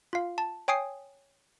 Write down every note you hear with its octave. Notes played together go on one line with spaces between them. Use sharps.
F4 F5
A5
C#5 G5 G#5 D#6 C7